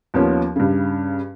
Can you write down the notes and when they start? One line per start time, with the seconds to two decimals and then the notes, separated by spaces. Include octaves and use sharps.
0.14 D#2 F3 B3 C#4
0.56 G2 C#3